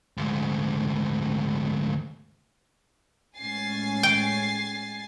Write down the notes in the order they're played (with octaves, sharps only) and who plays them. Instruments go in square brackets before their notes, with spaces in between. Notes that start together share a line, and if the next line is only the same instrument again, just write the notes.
[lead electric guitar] D2 G#2
[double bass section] A2 G#3 C#4 [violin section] G#5 A6 C7
[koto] G5